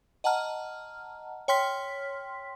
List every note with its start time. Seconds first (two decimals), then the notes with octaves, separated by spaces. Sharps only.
0.24 D#5 F#5 A5 A#5 F6
1.48 C#5 G5 C6 F6 B6